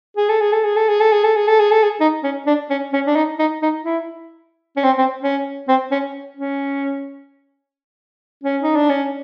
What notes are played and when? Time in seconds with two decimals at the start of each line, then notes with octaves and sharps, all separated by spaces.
0.17 G#4
0.29 A4
0.41 G#4
0.52 A4
0.64 G#4
0.76 A4
0.88 G#4
1.00 A4
1.12 G#4
1.24 A4
1.36 G#4
1.48 A4
1.59 G#4
1.71 A4
1.83 G#4
2.00 D#4
2.23 C#4
2.47 D4
2.70 C#4
2.93 C#4
3.07 D4
3.16 D#4
3.39 D#4
3.62 D#4
3.84 E4
4.77 C#4
4.84 C4
4.98 C4
5.22 C#4
5.68 C4
5.91 C#4
6.37 C#4
8.43 C#4
8.62 D#4
8.76 D4
8.90 C#4